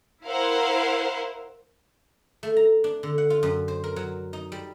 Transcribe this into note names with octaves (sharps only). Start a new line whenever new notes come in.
E4 A#4 C5 F5 F#5
A3
A#5
D4
D3
F#5
F4
F#2
C5
A#4
F#3
D#4
G3